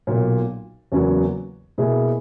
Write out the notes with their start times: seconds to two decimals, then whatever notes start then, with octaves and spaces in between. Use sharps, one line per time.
0.07 B1 A#2 F#3
0.92 E2 C#3 F#3 A#3
1.78 B2 A#3 E4 G#4